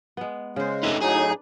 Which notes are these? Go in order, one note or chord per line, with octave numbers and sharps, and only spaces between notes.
G#3 B3
C#3 G#3 C5
A3 D4 D#4 B4
A2 F#3 D#4 G#4